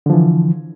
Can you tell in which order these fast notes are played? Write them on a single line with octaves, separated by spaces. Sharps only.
D3 F3 E3